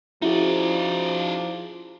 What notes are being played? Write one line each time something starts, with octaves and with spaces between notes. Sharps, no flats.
F3 C#4 D#4 E4 F#4 G#4 D5